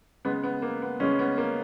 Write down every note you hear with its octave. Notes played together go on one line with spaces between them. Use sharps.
C#3 G#3 B3
B3
A#3
B3
C#3 G#3 C#4
B3
A#3